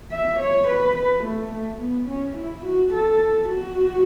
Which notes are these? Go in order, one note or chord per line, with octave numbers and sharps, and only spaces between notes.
E5
C#5
B4
B4
A3
A3
B3
C#4
E4
F#4
A4
F#4